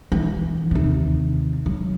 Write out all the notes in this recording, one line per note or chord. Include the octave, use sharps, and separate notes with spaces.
E3
D#2 C3
F#3